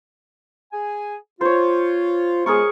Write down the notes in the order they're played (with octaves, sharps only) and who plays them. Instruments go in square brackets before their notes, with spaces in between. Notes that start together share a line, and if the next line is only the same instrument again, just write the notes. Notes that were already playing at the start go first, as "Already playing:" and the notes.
[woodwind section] G#4 G#5
[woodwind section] F4 [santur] C5 C#5
[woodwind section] G#3 B3 F4 [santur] G#4 A#4 C#6